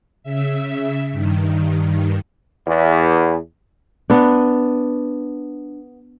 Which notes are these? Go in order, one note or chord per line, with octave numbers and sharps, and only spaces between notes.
C#3 E5
G2 D#3
E2
B3 D4